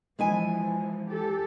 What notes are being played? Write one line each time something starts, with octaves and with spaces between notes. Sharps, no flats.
E3 F3 G#3 E4 G#5
G4 A4